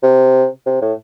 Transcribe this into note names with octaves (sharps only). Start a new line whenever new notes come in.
C3
C3
A2